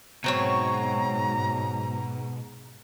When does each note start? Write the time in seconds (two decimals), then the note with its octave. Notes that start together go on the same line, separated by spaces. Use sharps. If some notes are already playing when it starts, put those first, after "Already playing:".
0.24 G#2 B2 F#3 C4 C#5 A#5